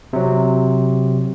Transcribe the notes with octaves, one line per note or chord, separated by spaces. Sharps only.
C3 F#3